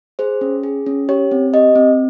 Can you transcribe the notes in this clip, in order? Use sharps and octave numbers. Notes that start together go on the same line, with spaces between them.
G#4 C5
C#4
G#4
C#4
G4 C#5
C4
G4 D#5
C4